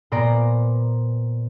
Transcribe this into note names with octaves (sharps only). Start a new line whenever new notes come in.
A#2 B3 C5 D5 A#5